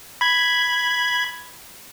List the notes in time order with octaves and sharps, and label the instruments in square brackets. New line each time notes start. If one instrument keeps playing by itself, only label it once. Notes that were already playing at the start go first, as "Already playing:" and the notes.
[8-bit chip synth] B5 G#6